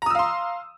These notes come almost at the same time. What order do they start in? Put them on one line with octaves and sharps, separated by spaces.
A#5 D#6 E6 F5 C6